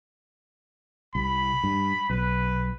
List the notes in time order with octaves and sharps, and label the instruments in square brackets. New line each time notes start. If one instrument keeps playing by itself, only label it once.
[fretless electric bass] C2 [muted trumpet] B5
[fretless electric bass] G2
[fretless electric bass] B1 [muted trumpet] B4